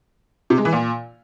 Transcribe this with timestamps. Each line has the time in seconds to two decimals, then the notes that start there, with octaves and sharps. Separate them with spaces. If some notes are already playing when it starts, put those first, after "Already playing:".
0.50 C3
0.58 G#3
0.65 E3
0.73 A#2